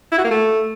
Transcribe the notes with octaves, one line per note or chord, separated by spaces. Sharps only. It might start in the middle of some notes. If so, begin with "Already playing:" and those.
E4
F#4
A#3
A3